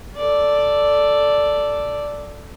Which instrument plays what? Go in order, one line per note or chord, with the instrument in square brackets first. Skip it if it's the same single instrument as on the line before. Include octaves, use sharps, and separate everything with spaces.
[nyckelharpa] A4 D5